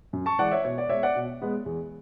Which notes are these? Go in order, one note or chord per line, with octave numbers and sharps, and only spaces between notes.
F#2
A5 C#6
E3 G#3 D5 F#5
C#5 E5
B2 C#5
D5
G#3 B3 C#5 E5
D5 F#5
B2
G#3 B3
E2